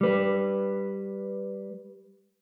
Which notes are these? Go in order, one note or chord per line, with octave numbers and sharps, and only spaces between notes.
G3 B4